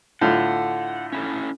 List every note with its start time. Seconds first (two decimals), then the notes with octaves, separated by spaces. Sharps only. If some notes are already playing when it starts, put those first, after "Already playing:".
0.21 A2 D3 F4 F#5
1.12 C#4 E4 A4